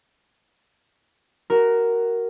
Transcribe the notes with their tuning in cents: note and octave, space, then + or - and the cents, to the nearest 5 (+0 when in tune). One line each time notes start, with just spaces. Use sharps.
F#4 +15 A#4 +0